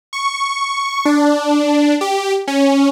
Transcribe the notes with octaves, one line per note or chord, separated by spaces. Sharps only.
C#6
D4
G4
C#4